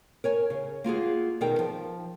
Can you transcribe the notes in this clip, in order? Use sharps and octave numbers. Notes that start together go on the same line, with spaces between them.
A#4 C#5 G#5
C#3
A#3 F4 F#4 G#4
B2 D#3 G#4 A#4 D5 G5
F3